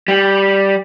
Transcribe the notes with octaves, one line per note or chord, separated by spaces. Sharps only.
G3